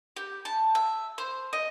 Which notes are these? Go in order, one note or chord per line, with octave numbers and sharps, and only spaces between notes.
G4
A5
E5
C5
D#5